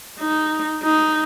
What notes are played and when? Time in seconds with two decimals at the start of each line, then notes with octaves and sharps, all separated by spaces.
0.20 D#4
0.83 D#4